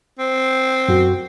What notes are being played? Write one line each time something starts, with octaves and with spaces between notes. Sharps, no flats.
C4
F#2 F#4